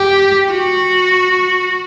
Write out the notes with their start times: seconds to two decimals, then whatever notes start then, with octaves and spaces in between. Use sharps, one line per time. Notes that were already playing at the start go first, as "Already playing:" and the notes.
Already playing: G4
0.52 F#4